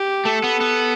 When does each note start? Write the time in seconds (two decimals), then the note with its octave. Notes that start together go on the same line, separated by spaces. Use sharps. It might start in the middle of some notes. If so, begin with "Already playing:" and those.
Already playing: G4
0.25 A3 A4
0.43 B3
0.61 B3